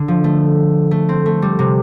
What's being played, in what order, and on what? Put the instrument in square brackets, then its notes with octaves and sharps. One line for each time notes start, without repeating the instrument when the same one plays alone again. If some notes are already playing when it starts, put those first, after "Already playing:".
Already playing: [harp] D3
F3
A3
A3
C4
A3
G3
C3